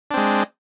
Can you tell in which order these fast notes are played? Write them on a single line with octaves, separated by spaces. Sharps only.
D4 C4 G#3